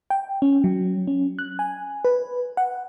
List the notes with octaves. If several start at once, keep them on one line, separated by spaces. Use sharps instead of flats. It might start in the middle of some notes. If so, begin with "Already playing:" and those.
G5
C#4
F#3
C#4
F#6
G#5
B4
F#5